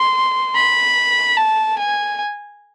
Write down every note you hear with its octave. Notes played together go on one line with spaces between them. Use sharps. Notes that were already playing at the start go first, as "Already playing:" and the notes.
Already playing: C6
B5
A5
G#5